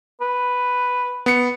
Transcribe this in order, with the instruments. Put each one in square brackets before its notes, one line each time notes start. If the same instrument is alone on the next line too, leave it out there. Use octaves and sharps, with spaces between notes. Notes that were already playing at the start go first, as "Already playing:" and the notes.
[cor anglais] B4
[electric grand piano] B3 C#7